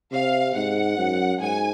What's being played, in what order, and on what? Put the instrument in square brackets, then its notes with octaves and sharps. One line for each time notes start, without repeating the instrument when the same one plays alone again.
[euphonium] C3 [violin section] F5
[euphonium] G#2 [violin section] F#5
[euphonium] F#2
[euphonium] G#2 [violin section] G#5